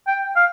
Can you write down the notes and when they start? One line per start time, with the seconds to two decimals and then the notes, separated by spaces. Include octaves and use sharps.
0.07 G5
0.36 F5